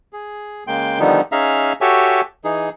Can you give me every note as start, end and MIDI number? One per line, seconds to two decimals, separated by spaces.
0.13 0.64 68
0.67 0.99 49
0.67 0.99 56
0.67 0.99 58
0.67 0.99 79
0.67 0.99 84
0.99 1.21 50
0.99 1.21 51
0.99 1.21 53
0.99 1.21 55
0.99 1.21 59
0.99 1.21 63
1.32 1.73 61
1.32 1.73 63
1.32 1.73 68
1.32 1.73 76
1.32 1.73 77
1.32 1.73 82
1.81 2.21 66
1.81 2.21 67
1.81 2.21 69
1.81 2.21 73
1.81 2.21 76
1.81 2.21 80
2.44 2.69 52
2.44 2.69 63
2.44 2.69 68